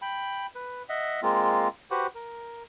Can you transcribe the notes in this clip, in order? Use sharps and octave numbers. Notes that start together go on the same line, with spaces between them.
G5 B5
B4
D#5 E5 F#5
G#3 A#3 C4 F4
F#4 G4 B4 C5 F#5
A#4